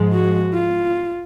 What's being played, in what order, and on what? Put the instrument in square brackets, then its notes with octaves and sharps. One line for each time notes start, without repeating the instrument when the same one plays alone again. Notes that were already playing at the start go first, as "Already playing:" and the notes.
Already playing: [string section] G#2 F3 G#3
[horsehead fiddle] F#4
F4